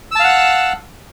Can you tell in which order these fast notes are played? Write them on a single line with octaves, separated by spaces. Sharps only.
E6 A5 F5 F#5 F#6